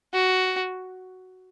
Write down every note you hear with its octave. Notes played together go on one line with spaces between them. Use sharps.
F#4